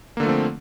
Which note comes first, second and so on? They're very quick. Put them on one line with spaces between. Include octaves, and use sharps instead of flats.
A#3 D3 A3 F3 C4